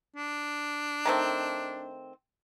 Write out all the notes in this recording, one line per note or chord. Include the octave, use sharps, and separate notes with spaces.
D4
D#3 A3 C4